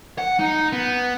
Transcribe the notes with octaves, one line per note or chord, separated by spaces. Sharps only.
F#5
D#4
B3